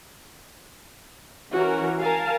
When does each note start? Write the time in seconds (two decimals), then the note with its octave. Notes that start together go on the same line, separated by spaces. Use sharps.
1.53 E3 C#4 F#4 A#4
2.00 A#4 F5 G#5 A5